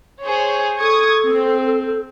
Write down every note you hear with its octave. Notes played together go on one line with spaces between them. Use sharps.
G#4 C5 C#5
A4 C#6 D#6 G#6
C4